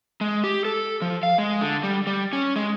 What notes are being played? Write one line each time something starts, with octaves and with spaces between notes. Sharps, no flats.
G#3
G4
A4
F3
F5
G#3
D3
G3
G3
C#4
G#3